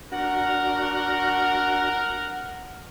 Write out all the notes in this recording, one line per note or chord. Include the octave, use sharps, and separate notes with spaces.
D4 F#4 A#4 F#5